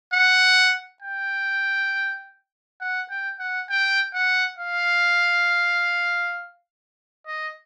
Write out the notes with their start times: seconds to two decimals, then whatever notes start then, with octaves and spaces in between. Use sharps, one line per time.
0.14 F#5
1.03 G5
2.81 F#5
3.11 G5
3.40 F#5
3.70 G5
4.14 F#5
4.59 F5
7.27 D#5